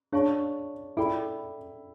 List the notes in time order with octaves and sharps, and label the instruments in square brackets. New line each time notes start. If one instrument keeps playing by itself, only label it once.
[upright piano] D4 [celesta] G#4 C#5 F5 A5 C#6
[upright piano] E4 [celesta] A4 D5 G5 B5